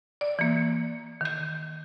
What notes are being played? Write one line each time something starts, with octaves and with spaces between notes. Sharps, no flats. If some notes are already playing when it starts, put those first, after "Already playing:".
D5
E3 A#3
D#3 G6